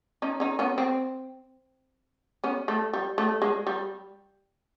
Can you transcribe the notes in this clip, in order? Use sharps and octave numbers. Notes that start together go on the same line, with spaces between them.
C#4 D#4
C#4 D#4
B3 C#4
C4
B3 C#4
A3
G3
A3
G#3
G3